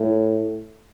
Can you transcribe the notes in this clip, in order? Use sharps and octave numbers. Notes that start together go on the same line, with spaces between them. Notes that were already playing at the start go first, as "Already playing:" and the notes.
Already playing: A2